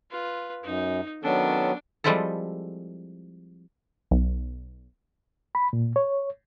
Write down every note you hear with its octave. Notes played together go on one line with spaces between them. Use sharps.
F4 B4
F#2 D#4
D#3 F#3 B3 C#4 D4 A4
F3 G3 G#3 C4 E4 A4
B1
B5
A#2
C#5